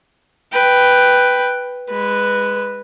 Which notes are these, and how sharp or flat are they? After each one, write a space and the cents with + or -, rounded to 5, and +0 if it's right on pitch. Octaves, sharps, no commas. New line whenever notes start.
B4 +0 G5 +0
G#3 -25 B4 +0